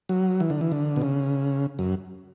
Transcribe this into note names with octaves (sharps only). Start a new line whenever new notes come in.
F#3
E3
D3
E3
D3
B2
C#3
F#2